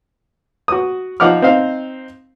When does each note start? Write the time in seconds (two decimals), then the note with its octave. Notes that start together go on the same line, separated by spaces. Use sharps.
0.68 F#4 D#6
1.20 F3 D#4 F#5 D6 F6
1.42 C4 D#4 C5 F5